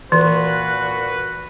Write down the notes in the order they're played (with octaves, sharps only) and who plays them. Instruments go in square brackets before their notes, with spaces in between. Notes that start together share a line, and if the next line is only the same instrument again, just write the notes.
[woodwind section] A#2 F#4 [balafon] E3 [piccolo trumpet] B4